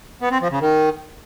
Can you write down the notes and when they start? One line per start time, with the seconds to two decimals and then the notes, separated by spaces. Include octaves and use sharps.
0.21 B3
0.31 C4
0.41 F3
0.51 C#3
0.61 D#3